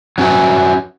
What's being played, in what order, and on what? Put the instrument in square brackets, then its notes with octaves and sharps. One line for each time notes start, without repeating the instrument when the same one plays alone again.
[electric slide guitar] F#3 C#4 F#4 B4 E5